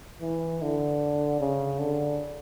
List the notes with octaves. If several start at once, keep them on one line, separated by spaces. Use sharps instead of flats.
E3
D3
C#3
D3